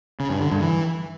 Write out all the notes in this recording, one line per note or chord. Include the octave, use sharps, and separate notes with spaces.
C#3
G2
D3
G2
E3